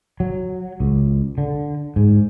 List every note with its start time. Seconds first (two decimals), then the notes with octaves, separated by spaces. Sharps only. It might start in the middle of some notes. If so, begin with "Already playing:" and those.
0.20 F#3
0.80 C#2
1.38 D3
1.96 G#2